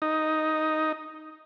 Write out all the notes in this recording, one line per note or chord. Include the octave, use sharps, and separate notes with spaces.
D#4